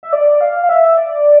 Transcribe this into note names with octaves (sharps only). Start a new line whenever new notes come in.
E5
D5
F5
F5
E5
D5